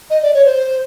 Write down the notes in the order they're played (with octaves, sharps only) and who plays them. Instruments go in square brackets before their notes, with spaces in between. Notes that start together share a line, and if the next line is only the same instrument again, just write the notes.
[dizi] D#5
D5
C#5
C5